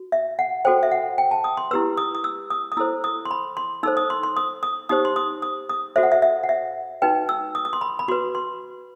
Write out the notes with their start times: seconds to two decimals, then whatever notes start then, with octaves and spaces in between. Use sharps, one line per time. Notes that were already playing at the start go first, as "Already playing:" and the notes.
Already playing: F#4
0.12 E5
0.39 F#5
0.65 F#4 A4 C5 G5
0.83 E5
0.92 F#5
1.18 G5
1.31 A5
1.44 D#6
1.57 C6
1.71 E4 G4 B4 E6
1.97 D#6
2.15 D#6
2.24 E6
2.50 D#6
2.72 D#6
2.77 E4 A4 C5 E6
3.04 D#6
3.25 C6
3.31 B5
3.57 C6
3.83 D#4 A4 C5 E6
3.97 D#6
4.10 C6
4.23 C6
4.37 D#6
4.63 D#6
4.89 D#4 G4 C5 D#6
5.05 C6
5.16 D#6
5.42 D#6
5.69 D#6
5.96 F#4 A4 C5 E5
6.03 F#5
6.12 E5
6.22 E5
6.44 F#5
6.49 E5
7.02 D#4 F#4 B4 G5
7.29 E6
7.55 D#6
7.65 D#6
7.73 C6
7.81 B5
7.99 B5
8.08 F#4 B4 C6
8.35 C6